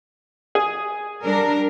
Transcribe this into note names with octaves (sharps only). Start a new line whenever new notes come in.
G#4
G3 D4 A#4